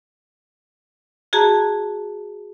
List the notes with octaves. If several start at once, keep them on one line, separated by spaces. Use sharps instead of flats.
F#4 G#4 A5 A#5